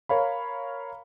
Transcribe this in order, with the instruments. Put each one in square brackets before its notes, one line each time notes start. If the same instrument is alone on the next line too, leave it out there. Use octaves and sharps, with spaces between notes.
[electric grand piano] A#4 C#5 F5 B5